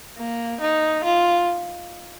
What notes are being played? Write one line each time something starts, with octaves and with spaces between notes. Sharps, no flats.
A#3
D#4
F4